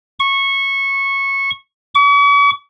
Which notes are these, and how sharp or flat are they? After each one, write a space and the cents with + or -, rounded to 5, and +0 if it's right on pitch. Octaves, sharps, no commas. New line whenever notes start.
C#6 -15
C#6 +45